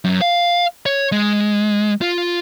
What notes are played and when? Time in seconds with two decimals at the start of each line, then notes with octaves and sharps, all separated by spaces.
0.05 F#2
0.21 F5
0.86 C#5
1.12 G#3
2.01 F4